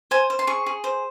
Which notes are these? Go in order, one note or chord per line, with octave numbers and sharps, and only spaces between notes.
C5 G#5
C5
C6
G#4 C#6
G#4
C5